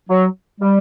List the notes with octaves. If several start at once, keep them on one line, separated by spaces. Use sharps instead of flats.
F#3
G3